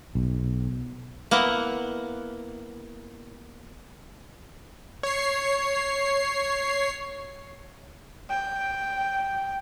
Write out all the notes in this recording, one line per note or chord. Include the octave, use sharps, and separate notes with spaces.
B1
A#3 B3 E4 F#5
C#5 C7
G5